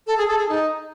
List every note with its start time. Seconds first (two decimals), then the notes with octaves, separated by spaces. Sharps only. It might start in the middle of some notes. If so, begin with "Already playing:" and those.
0.07 A4
0.17 G#4
0.28 A4
0.38 G#4
0.49 D#4